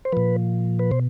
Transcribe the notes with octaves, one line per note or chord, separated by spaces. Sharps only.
C5
A#2 F3 B4
B4
B2 C5